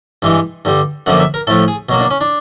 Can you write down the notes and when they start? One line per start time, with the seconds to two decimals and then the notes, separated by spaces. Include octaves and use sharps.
0.22 G2 E3 G#3
0.65 G2 D3 G3
1.06 F#2 D3 F3 A#3 F#5
1.20 E5
1.34 A#4
1.47 A2 F3 A3 A4
1.68 G#4
1.89 B2 F#3 A#3
2.00 D4
2.11 C#4
2.21 D4